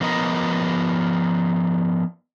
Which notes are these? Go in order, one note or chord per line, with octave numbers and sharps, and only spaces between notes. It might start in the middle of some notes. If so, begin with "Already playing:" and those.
F3 B3 A#4 D#5